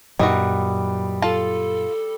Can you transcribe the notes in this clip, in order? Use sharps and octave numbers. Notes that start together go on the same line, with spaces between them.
F#2 A#2 D#3 E3 F#3 G3 F#4 D#6
F4 A4 A5